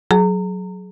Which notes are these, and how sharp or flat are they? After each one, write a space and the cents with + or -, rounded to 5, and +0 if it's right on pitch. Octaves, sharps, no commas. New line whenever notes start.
F#3 +0 G#4 +30 A#5 -30